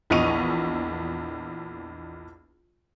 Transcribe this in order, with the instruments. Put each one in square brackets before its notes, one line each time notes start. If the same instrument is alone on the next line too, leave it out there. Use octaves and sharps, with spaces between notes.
[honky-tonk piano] A#1 E2 D#5 C#6 D#7 F7